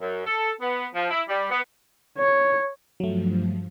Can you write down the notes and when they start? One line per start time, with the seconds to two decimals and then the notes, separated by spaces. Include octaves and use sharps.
0.01 F#2
0.27 A4
0.61 B3
0.95 F3
1.11 E4
1.29 G3
1.51 B3
2.19 C#5
3.00 G2 F3 F#3 A3